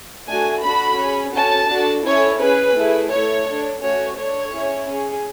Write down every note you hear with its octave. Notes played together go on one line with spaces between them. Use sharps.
A3 D4 F#4 G#5
D4 F#4 A4 B5
C#4 G#4
C#4 F#4 A4 A5
D4 F#4 A4
C#4 E4 A4 C#5
C#4 G#4 B4
A3 E4 G#4
A3 E4 A4 C#5
D4 A4
A3 C#4 F#4 C#5
D4 A4 C#5
C#4 E4 G#4
C#4 G#4